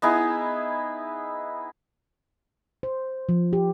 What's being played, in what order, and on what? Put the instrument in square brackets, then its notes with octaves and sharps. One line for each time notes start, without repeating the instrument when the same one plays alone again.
[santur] B3 D#4 E4 G#4
[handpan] C5
F3
G4